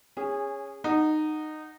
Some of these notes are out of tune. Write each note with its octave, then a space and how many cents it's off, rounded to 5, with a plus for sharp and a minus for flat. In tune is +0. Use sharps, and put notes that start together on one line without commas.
C#4 +0 G#4 -20
D#4 -15 F#5 +0